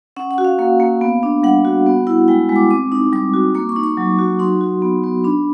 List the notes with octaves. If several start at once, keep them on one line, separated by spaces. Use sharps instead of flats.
C#4 F#5
F#5
F#4
F5
A#3 F5
A#3
B3
D4
G3 F#5
F#4
B3
E4
G#3 G5
G#3
D6
C4 D6
D#4
G3 D6
F#4
A#3 D6
C#6
D#4
C#6
F#3
F#4
D#4 C6
F#4
B3
B3
D4 B5